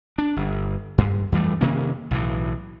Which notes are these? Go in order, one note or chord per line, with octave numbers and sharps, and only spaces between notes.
D4
G1
G2
F2 E3 G3 A3
C3 D#3 A#3 C#4
B1 A2 E3